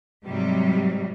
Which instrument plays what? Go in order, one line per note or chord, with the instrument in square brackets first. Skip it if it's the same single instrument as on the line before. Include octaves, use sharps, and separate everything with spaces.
[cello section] G#2 C3 F#3 G3